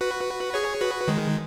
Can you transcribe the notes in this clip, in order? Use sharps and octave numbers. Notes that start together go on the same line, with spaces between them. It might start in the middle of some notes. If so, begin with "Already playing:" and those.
F#4 B4
G#4 C#5
F#4 B4
D#3 G#3